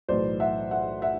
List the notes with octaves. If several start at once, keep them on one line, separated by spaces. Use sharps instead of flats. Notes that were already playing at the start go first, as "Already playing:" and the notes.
B1 A2 E3 C5 D5
E5 F#5
E5 F#5
E5 F#5